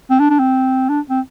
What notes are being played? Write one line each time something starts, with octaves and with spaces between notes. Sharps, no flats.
C4
D4
D4
C4
D4
C4